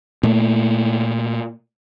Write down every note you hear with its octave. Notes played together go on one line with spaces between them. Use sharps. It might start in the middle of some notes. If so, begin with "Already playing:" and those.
A#2 A3